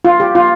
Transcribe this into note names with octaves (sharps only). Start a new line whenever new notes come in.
F4
G4
F4